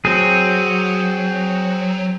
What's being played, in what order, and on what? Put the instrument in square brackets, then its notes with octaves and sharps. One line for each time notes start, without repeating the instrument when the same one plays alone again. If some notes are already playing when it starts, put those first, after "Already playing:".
[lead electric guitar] F#3 [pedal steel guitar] C4 G#4